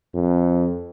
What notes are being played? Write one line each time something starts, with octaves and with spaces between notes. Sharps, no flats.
F2